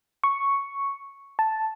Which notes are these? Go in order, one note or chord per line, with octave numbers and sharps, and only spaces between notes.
C#6
A5